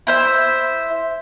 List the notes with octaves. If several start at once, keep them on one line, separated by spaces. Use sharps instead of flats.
E4 C5 E5